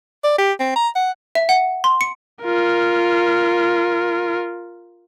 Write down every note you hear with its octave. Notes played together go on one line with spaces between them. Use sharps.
D5
G4
C4
A#5
F#5
E5
F#5
C6
C#7
F4 A#4